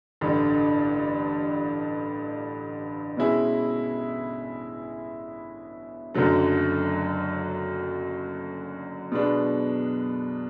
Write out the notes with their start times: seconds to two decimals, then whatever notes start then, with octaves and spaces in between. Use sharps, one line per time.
0.21 A1 G2 D3
3.17 B2 G#3 C#4 E4 G#4
6.14 F#1 F#2 D3 F#3 A3
9.12 B2 G#3 B3 D4